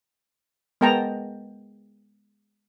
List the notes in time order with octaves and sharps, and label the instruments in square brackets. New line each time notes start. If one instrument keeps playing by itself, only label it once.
[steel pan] G#3 B3 A#4 G5 A5 A#5